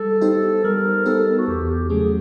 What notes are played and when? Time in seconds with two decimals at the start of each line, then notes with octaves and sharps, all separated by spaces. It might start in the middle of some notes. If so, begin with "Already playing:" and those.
Already playing: G3 A4
0.21 B3 D#4 G4 C5
0.64 G3 A#4
1.05 B3 D#4 G4 A4 C5
1.38 F#4
1.47 E2 G4
1.69 G4
1.89 C#3 F#3 A3 C#4 G#4